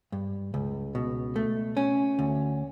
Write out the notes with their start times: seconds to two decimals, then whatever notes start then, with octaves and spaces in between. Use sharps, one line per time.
0.12 G2
0.54 C#2
0.95 B2
1.36 A3
1.77 C#4
2.19 D2